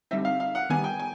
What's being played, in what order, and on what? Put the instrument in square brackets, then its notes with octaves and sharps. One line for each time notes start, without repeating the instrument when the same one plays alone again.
[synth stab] D3 G3 C4 D#4 [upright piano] E5
[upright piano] F5
F5
F#5
[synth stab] D#3 G3 B3 [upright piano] G#5
[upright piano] G5
G#5